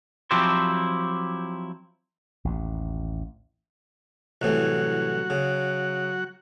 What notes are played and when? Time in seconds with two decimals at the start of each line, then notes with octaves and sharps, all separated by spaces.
0.31 F3 F#3 C4 E4 G4 C5
2.45 A1 D#2
4.42 C2 A2 E3 F#3 F#4 F#5
5.30 C#3